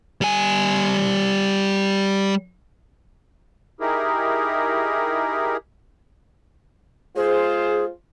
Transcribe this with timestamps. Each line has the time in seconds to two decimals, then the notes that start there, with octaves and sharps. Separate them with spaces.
0.21 G3 G#5
3.80 D#4 E4 G4 G#4 A#4
7.16 G#3 F4 G#4 C5